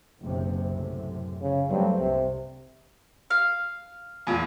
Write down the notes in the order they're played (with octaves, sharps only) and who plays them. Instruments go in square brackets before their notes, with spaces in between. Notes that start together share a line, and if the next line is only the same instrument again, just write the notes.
[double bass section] F#1 B1 C3
F#2 A2 C3
[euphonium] C#3
[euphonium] G2 [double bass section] F#3 A3 C4
[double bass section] C2 G2 [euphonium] C3
[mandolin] F5
[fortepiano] E2 A#2